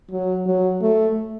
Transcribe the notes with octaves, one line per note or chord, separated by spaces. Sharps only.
F#3
F#3
A3